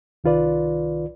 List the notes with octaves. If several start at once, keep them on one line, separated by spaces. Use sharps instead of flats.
C2 D#3 F4 B4 D5